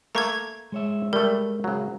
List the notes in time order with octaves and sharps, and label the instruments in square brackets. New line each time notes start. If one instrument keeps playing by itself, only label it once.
[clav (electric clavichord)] A3 A#3 A4 [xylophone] A#5 C#6 G#6
[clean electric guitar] G#3 C#5 E5
[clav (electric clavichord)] G3 A3 [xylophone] A#4
[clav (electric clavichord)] C#3 F#3